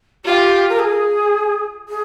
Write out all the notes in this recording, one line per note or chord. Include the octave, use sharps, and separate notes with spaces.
F4 G4
A#4
G#4
G#4